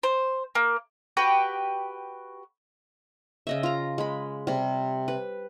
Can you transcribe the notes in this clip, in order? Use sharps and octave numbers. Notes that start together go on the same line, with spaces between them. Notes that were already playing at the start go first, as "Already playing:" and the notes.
C5
A#3
F#4 G4 B4 G5
C#3 D#5 E5
F4 A#5
G#3 B5
C3 G3
B4